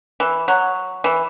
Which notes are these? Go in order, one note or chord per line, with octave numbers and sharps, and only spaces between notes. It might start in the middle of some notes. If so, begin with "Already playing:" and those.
E3
F#3
E3